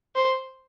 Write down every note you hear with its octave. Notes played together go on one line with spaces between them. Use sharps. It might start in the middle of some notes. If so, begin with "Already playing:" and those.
C5